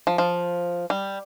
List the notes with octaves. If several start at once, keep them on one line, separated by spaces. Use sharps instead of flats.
F3
F3
G3